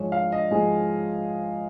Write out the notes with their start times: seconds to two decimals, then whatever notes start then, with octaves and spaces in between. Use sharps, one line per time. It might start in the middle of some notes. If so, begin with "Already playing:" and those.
Already playing: G#2 F3 G#3 C#5
0.12 F5
0.32 D#5
0.51 G#2 F3 G#3 G#4